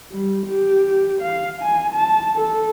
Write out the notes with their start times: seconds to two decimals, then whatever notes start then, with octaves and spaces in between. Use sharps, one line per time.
0.12 G3
0.47 G4
1.22 F5
1.61 G#5
1.93 A5
2.36 A4